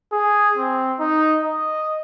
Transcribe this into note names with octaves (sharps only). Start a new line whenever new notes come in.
G#4
C4
D#4
D#5